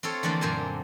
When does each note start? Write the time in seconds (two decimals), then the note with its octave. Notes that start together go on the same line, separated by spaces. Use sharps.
0.03 C4 F4 A4 C#5
0.23 D3 E3 F3 A3 A#3
0.41 F#2 A#2 C5 G#5 A5